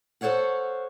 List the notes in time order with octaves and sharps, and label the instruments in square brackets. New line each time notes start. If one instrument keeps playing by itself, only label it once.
[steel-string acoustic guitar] A4 C5 C#5 F5 F#5